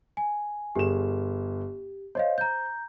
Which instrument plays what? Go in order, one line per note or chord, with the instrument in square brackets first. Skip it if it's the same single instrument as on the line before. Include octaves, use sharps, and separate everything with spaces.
[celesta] G#5
[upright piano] G1 G#4 E7 [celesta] G4
[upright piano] C5 [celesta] C#5 D#5 F5
[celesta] A#5 G6